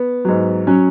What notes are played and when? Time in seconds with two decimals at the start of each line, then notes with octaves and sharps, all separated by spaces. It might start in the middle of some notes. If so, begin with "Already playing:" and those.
Already playing: B3
0.25 G#2 F#3
0.67 F#3 C#4